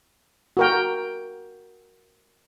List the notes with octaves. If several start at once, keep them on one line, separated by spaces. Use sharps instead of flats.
F#4 A#4 G5